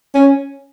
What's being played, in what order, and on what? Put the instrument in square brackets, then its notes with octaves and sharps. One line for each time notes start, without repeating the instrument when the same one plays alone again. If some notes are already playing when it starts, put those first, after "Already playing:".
[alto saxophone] C#4